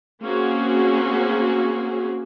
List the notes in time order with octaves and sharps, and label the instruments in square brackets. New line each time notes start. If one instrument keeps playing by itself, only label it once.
[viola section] A#3 C4 C#4 F#4 G#4